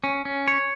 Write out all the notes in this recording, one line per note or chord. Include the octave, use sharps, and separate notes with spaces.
C#4
C#4
C#5